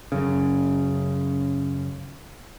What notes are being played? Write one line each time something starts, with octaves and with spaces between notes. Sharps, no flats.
F#2 C#3